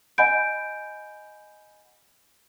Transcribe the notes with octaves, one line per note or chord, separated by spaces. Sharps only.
D#5 F#5 G#5 B5 G6 D7